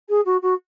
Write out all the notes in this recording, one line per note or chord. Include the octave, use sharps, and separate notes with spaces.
G#4
F#4
F#4